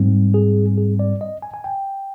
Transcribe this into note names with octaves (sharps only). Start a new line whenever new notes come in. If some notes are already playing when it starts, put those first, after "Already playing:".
Already playing: G#2 G3 C4
G#4
G#4
D5
D#5
G#5
G#5
G5